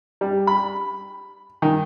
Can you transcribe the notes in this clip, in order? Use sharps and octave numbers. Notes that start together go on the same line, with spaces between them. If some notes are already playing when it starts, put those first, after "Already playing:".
G3
B5
D#3